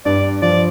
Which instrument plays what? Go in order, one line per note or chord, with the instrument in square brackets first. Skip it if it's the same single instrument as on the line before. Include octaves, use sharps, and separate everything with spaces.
[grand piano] G2 [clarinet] D5
[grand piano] F3 [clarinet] D5